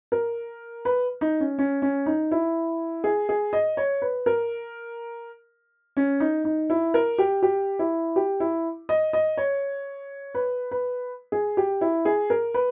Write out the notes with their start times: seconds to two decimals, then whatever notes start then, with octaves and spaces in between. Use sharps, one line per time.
0.12 A#4
0.85 B4
1.21 D#4
1.40 C#4
1.59 C#4
1.82 C#4
2.06 D#4
2.31 E4
3.04 G#4
3.29 G#4
3.53 D#5
3.77 C#5
4.02 B4
4.26 A#4
5.97 C#4
6.20 D#4
6.45 D#4
6.70 E4
6.94 A#4
7.18 G4
7.43 G4
7.79 E4
8.16 G4
8.40 E4
8.89 D#5
9.13 D#5
9.37 C#5
10.35 B4
10.71 B4
11.32 G#4
11.57 G4
11.81 E4
12.05 G#4
12.30 A#4
12.54 B4